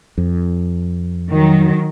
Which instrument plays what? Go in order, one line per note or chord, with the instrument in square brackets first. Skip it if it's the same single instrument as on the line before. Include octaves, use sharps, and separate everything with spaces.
[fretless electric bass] F2
[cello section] D#3 F#3